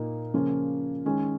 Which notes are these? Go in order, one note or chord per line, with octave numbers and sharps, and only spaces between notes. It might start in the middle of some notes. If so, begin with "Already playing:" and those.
Already playing: A#2 A#3 D#4
C#3 F3 A#3 C#4 F4
D#3 G#3 C#4